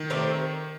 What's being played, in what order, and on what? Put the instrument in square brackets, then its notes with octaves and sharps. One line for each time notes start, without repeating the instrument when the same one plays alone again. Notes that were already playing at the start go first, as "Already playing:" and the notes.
Already playing: [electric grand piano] D#3
[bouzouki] A3 C4 G4 A#4